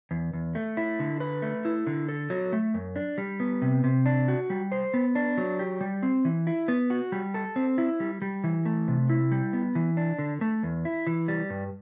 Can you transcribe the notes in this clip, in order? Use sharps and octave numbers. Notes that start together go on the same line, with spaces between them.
E2
E2
A3
E4
D3
B4
A3
E4
D3
A4
F#3
A3
F#2
D4
G3
B3
C3
C3
D4
F#4
G3
C5
B3
D4
F#3
G4
G3
C4
E3
E4
B3
F#4
G3
A4
C4
E4
G3
G3
E3
A3
C3
E4
G3
B3
E3
D4
D3
A3
E2
E4
E3
G3
G2